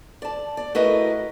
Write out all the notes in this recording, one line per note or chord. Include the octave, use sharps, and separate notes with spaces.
D5 A5
D5
A3 E4 F#4 A#4 B4 D#5